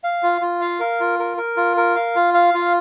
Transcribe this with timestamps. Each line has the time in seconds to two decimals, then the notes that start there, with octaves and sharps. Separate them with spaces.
0.04 F5
0.23 F4
0.42 F4
0.61 F5
0.80 A#4
1.00 F4
1.19 A#4
1.37 A#4
1.57 F4
1.77 A#4
1.95 F5
2.16 F4
2.34 F5
2.54 F4